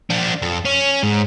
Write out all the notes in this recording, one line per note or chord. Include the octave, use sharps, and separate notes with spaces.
F3 D4
F2
C#4
G#2